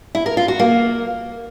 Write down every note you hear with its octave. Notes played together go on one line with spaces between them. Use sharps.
E4
A#4
F4
F#4
A#3